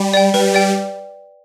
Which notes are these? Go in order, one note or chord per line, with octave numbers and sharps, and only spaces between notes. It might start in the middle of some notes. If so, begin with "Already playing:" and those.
Already playing: G3
D5 G5
G3 B4
D5 G5